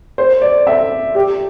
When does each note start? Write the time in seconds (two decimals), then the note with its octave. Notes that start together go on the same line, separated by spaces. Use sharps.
0.18 C5
0.41 D5
0.67 E5
1.15 G4